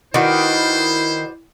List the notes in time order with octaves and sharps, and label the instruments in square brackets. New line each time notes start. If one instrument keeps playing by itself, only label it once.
[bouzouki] D#3 [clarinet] E4 [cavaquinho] F#4 B4 D5 [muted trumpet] C5